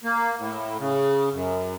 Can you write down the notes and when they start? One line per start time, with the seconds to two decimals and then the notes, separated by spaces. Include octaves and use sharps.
0.04 A#3
0.39 A2
0.79 C#3
1.33 F#2